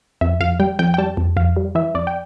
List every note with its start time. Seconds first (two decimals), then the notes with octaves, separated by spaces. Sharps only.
0.21 F2 E5
0.40 F2 F5
0.60 G3 G5
0.79 F2 G5
0.94 G5
0.98 G3 A5
1.17 F2
1.37 F2 F5
1.56 G3
1.75 E3 E5
1.95 F2 D5
2.07 G5